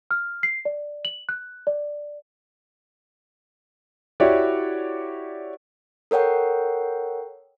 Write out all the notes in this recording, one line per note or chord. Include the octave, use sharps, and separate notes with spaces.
F6
C7
D5
F#7
F#6
D5
E4 F#4 G4 C#5 D5
A4 A#4 C#5 F#5 G5